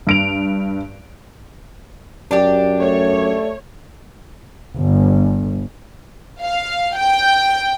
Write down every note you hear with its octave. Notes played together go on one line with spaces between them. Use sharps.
G2 D7 F7
F#2 D4 G4
A3 C#5
G1
F5
G5